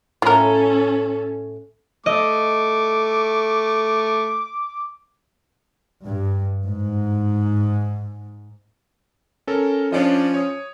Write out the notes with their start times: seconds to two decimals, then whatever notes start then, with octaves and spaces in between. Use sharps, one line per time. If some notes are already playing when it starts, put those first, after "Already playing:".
0.22 A2 C#4 F4 A4 A#4
2.06 A3 D#5 D6
6.04 G2
6.66 G#2
9.47 C#4 A4 A#4
9.92 F3 C#4 D4 D5 D#5
10.34 C#5 D#6